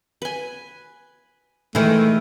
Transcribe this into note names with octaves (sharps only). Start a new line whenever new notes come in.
B4 G#5
D#3 E3 G#3 A3 E4